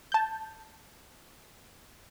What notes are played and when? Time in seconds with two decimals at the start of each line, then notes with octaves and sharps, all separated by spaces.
0.12 A5 G6